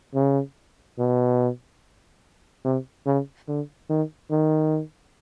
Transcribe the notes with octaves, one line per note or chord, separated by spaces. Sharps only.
C#3
B2
C3
C#3
D3
D#3
D#3